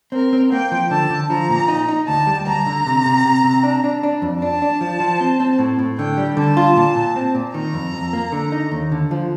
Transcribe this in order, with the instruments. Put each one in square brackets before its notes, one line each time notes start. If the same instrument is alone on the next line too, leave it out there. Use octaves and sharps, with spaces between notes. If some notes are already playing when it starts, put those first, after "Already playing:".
[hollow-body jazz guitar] C4 [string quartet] A#4
[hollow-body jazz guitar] C4
[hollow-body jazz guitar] A#3 [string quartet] G5
[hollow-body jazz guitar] F3
[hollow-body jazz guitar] D3 [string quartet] A5
[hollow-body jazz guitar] D3
[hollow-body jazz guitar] F3 [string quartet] A#5
[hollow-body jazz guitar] A#2
D#4
D#4
[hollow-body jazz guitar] D2 [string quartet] A5
[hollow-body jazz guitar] G3
[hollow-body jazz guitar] D2 [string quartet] A#5
[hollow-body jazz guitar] D3
C3
C3
C3
C3
D4
D4
D4
F2
[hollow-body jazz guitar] D4 [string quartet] A5
[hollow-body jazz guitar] D4
F3
F3
C4
C4
A2
A2
[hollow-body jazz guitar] D3 [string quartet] G5
[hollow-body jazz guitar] G3
[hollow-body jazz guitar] D3 [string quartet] A5
[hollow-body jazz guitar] F4
A#2
A#2
C4
A#2
[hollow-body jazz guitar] D#3 [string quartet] A#5
[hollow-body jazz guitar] F2
F2
A#3
D3
D#4
D#2
D3
F3